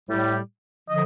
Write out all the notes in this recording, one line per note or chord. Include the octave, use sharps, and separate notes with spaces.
A2 G3
D3 F3 D#5